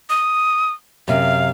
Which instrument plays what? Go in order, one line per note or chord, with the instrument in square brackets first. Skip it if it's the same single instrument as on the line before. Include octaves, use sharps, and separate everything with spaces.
[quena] D#6
[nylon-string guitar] F#2 C3 [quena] F5